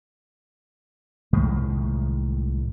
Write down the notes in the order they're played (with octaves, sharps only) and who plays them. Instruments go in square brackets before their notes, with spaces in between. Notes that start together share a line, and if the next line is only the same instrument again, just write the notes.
[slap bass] C2 A2 D#3 G#3